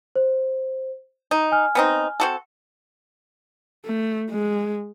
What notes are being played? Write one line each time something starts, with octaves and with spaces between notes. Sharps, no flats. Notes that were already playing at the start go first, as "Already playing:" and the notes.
C5
D#4 A#5
G#5 F6
B3 C4 D#4
C4 F#4 A4
A3
G#3